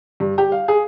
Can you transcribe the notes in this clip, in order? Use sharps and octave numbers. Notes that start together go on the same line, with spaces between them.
G2
G4
F5
G#4